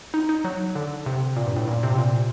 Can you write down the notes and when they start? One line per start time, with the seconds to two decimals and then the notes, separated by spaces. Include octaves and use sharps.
0.14 D#4
0.29 D#4
0.44 F#3
0.75 D3
1.06 C3
1.37 A#2
1.47 G2
1.57 A2
1.68 A#2
1.83 C3
1.98 A#2